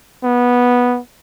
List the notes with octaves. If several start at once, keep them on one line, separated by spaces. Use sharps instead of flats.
B3